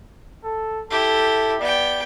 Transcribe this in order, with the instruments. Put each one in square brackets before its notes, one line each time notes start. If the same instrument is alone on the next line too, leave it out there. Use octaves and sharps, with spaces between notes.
[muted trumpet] A4
[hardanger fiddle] E4 G4 [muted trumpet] A4
[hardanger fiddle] B3 G5 [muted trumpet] D5